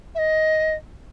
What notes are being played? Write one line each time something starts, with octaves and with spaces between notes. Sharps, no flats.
E5
D#5